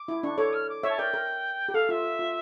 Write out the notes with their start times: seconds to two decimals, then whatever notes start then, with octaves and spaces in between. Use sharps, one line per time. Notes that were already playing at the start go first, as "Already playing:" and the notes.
Already playing: D6
0.08 E4
0.23 D4 C#6
0.38 A4 C#5 D6
0.53 F6
0.69 D6
0.83 C#5 E5
0.89 A5
0.98 A#4 D5 G5
1.14 A#4
1.69 G4
1.74 A4 F5
1.89 F4 E5
2.19 F4